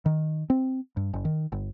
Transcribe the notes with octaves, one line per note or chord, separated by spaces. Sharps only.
D#3
C4
G2
F#1
D#3
G1